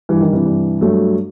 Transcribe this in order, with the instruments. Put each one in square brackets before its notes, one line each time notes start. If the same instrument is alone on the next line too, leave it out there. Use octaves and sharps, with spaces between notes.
[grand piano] G2 [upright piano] E3
[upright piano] D#3
C3 E3
[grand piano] G2
[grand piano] G2 [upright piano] F#3 A3